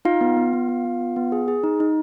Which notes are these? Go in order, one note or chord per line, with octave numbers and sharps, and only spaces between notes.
D#4 F4 F5
B3
B3
B3
B3
B3
B3
B3
G#4
G#4
D#4
D#4